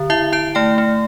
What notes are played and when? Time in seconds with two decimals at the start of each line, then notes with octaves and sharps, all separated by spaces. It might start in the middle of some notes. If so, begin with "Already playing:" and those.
Already playing: D3
0.10 E4 E5
0.32 E4 A5
0.55 A3 G5
0.78 A3